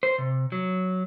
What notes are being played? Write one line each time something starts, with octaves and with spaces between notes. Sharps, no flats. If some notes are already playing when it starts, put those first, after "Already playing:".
C5
C3
F#3